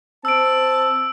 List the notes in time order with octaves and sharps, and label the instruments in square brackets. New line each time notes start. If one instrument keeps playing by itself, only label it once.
[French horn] C4 [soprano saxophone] A5 [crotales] E6 D7